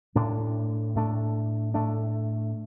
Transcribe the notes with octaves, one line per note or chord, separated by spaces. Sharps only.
A2 A3 D4
A2 A3 D4
A2 A3 D4